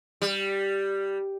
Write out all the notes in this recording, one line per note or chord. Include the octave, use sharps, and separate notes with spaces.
G3